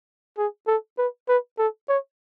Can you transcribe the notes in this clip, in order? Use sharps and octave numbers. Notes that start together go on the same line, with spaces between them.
G#4
A4
B4
B4
A4
C#5